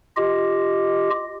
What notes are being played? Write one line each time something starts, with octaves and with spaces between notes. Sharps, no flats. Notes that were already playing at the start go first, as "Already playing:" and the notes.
F4 G4 D#5